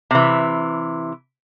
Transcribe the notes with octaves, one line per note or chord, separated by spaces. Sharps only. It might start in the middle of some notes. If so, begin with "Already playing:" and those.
C3 E3